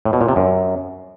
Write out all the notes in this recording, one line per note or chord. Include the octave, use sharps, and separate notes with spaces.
A2
B2
A#2
C3
F#2